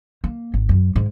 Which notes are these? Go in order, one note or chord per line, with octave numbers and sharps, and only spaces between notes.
A#3
G#1
F#2
G#2